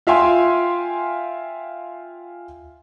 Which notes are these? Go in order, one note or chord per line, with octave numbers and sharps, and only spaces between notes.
F4 E5 F5 G5 G#5 C6